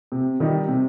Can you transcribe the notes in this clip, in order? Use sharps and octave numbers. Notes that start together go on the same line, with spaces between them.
C3
D#3 G3 D#4
C3